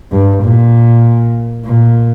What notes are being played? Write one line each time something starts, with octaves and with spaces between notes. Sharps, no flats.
G2
A#2
A#2